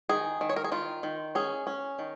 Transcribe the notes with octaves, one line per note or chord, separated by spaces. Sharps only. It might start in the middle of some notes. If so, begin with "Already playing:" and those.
D#3 G#4
D#3
C#5
A#4
G#4
D#3 F4
D#3
C#4 G#4
C#4
D#3